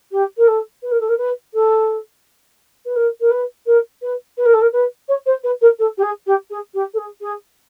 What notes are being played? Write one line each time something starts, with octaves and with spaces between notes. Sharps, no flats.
G4
A#4
A4
B4
A#4
A4
A#4
B4
A4
B4
A#4
A#4
B4
A#4
B4
B4
A#4
A4
A#4
B4
C#5
C5
B4
A#4
A4
G4
G#4
G4
G#4
G4
A4
G#4
G#4